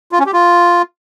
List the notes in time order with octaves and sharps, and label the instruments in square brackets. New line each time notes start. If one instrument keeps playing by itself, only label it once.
[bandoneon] F4
C#4
G4
F4